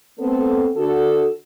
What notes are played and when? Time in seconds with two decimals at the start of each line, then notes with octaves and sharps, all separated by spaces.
0.19 A3 B3 C4 A4
0.76 D3 F#4 A4